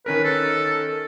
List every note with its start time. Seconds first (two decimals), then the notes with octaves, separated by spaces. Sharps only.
0.06 D#3 C#4 A#4 B4
0.24 A4